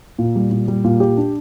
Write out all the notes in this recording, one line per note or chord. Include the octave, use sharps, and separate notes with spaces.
A#2
G3
A#2
G3
A#2
G4
D4